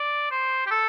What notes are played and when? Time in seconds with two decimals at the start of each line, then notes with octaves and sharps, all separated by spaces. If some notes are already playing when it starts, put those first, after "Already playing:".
Already playing: D5
0.31 C5
0.66 G4
0.71 A4